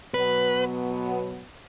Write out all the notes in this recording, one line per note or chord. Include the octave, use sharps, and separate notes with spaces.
B2 F#3 B3 B4